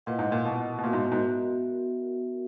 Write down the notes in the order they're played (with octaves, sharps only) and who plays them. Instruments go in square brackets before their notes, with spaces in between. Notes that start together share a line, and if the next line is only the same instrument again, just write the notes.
[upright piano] A#2 [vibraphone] E4 B4 D#5 F#5
[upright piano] G#2
A#2
B2
B2
[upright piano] A#2 [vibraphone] B3 F#4 A#4 E5
[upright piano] G#2
G#2